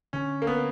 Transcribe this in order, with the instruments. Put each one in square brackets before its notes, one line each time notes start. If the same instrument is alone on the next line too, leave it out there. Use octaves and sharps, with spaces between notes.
[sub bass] D3 [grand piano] C#4
[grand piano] A#3
B3